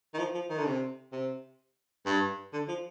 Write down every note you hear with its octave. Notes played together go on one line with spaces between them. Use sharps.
D#3
F3
F3
D#3
D3
C3
C3
G2
D3
F3